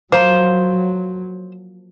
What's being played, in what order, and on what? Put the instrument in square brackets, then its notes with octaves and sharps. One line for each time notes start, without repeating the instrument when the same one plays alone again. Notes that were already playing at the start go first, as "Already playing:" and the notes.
[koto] F3 A#3 [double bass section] F#3 [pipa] C5